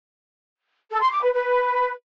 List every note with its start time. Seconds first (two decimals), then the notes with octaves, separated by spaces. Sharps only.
0.90 A4
1.01 C6
1.11 D6
1.22 B4
1.33 B4